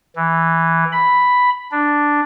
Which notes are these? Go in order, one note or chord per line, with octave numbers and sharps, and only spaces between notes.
E3
B5
D4